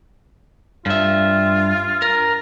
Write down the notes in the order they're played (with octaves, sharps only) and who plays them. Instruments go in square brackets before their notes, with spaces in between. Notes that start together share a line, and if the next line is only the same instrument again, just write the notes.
[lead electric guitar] G2 E5 [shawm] F4
[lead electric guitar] A#4